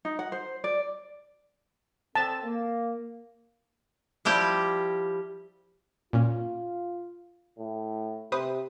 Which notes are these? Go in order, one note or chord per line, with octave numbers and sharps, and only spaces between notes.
D#4
F#5
C5
D5
C4 A4 A5
A#3
F3 G3 E4 G4
A#2 C#4 F4
A2
C3 B4 C5 D#6